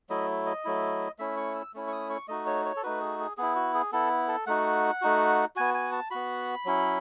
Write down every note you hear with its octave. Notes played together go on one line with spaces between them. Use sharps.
F#3 A3 E4 D#5
D#5
F#3 A3 E4
A3 C#4 E4 E5
C#6
E6
A3 C#4 E4
C#6
D#6
C#6
A3 D#4 F#4 D#5
C#5
C#5
A4
A3 D#4 F#4 B4
G#4
G#4
B3 E4 G#4
F#4
G#4
B3 E4 A4
A4
A3 D#4 F#4 F#5
A3 D#4 F#4
B3 F#4 G#5
G#5
A5
B3 F#4 B5
F#3 C#4 E4